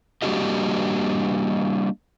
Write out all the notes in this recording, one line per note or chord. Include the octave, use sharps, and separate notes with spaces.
G3 A#3 D4 F#4 G4 D#5